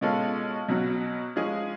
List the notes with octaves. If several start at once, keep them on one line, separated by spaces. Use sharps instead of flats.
B2 G#3 C#4 F4 A4
B2 F#3 C#4 F#4
F3 G#3 C#4 G#4